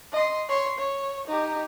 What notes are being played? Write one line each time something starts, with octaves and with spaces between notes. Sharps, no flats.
D#5 C6
C#5 C6
C#5
D#4 G4